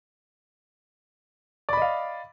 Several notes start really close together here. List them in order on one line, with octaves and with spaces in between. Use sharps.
D5 B5 D#5 F5